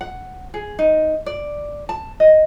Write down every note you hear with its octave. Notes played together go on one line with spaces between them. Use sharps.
F#5
G#4
D#4
D5
A5
D#5